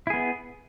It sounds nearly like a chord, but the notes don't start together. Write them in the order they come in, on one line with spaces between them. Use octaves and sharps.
E4 G#4 B3